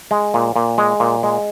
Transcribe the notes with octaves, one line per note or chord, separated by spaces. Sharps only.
G#3
A#2
A#2
G#3
A#2
G#3